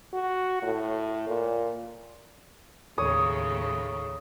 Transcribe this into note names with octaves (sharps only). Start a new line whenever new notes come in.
F#4
A2
A#2
D#2 A2 C#3 C#5 D#6